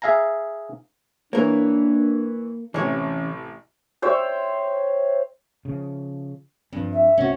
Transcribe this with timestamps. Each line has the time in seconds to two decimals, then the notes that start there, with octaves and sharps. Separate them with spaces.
0.02 G#4 E5 F5 G#5 A#5
1.33 E3 A#3 D4 A#4 C#5
2.74 A1 C3 E3 C#4 C#5
4.02 C5 C#5 E5 G5
5.65 C#3 F3
6.73 G2 F3 C4
6.93 E5
7.18 C2 C4 C#4 F#4